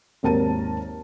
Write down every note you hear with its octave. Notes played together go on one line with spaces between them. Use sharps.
G#1 D#2 A#4 A5 D#7